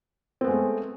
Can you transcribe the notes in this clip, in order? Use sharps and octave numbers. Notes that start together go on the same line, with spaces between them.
G#3 A3 B3 C4